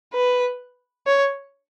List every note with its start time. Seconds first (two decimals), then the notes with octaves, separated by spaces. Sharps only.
0.14 B4
1.07 C#5